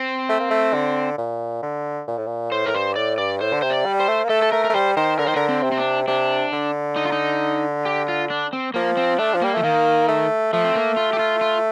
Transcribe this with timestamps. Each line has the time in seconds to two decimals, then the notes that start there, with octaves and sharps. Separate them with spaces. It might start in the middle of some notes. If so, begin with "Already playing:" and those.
Already playing: C4
0.29 A3
0.40 A#3
0.50 A3
0.74 D3
1.18 A#2
1.62 D3
2.07 A#2
2.17 A2
2.26 A#2
2.52 A2 C5
2.66 A2 A#4
2.74 G2 C5
2.96 A2 D5
3.18 G2 D5
3.41 A2 C5
3.53 D3
3.62 C3 C5
3.70 D5
3.85 G3
4.00 C5
4.08 A3
4.24 A#3
4.29 A3 A4
4.42 A4
4.52 A3 A#4
4.64 A#4
4.70 A3
4.74 G3 C5
4.97 D#3 C5
5.18 D3 A#4
5.27 D#3 C5
5.34 D3 A#4
5.49 C4
5.63 C3
5.72 C4
5.78 D4
6.07 C3 D4
6.52 D3
6.96 D#4
7.05 F4
7.12 D#4
7.85 G4
8.08 F4
8.30 D4
8.53 C4
8.74 F3 A#3
8.97 C4
9.19 A3 D4
9.34 F3
9.42 G3 A#3
9.54 F3 A3
9.63 D#3 A#3
10.08 A3
10.53 F3 A3
10.64 C4
10.75 A#3
10.97 F4
11.13 G4
11.19 F4
11.41 F4